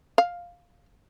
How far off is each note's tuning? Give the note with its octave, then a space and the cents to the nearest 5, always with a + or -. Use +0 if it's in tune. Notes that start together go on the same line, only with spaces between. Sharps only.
F5 +5